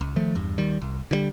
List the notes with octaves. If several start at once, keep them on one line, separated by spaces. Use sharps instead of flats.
C#2
D#3 F3 A3
E2 G2
D#2 D#3 G3
C2
D3 D#3 G3